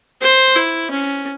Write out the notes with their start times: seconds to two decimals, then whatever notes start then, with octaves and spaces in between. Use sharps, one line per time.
0.21 C5
0.56 E4
0.91 C#4